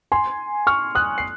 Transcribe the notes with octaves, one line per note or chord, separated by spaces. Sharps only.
G#5 C6
C#6 F6
D#6 F#6
C7